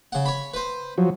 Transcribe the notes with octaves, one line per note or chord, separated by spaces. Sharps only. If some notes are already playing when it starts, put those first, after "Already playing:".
C#3 F#5
C#5 B5
B4 C5
F3 F#3